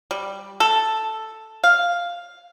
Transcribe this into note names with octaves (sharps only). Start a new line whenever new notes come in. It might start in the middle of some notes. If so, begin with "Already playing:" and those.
G3
A4
F5